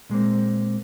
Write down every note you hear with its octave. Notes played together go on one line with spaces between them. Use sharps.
A#2 G#3 A#3 C4